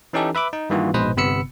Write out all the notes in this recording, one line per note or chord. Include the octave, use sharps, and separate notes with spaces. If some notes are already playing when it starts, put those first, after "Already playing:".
E3 C#4 D#4 G4 A4
B4 E5 B5 D6
D#4
G2 D#3 E3 A#3 F4 F#4
A#1 G#2 B2 B4 C5 D#5
G1 C3 B3 B5 E6 C#7